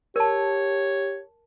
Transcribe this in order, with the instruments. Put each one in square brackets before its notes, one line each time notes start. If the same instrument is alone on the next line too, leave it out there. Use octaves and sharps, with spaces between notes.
[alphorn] G4 [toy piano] A#4 A5 [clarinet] C#5